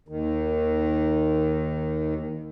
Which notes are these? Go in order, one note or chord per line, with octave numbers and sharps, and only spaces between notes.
D#2 D#3